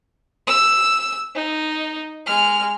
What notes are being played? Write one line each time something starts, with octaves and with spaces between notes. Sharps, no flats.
E6
D#4
G#3 F6